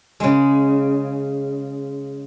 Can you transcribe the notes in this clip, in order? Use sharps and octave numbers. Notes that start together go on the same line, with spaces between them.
C#3 G#3